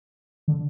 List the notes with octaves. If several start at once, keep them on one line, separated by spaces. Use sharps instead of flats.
D3